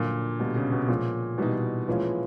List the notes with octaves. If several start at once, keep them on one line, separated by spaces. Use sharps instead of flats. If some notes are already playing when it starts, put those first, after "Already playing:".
Already playing: F#2 A#2 D3 F3 A#3 D4
B2 D3 G3 A#3
C#3
B2
A#2 F3 G#3 C#4
B2 E3 G3 B3 D#4
A#2 E3 F3 G#3 C#4 F4